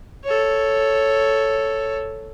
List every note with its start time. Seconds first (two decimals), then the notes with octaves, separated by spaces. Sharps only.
0.25 A4 C#5